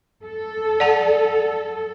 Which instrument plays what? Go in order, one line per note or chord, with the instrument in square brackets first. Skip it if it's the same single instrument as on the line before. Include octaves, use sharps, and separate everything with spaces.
[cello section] A4
[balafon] D5 F#5 A5